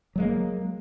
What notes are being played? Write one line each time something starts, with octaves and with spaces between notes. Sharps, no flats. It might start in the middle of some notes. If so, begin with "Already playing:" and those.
F#3 G#3 A#3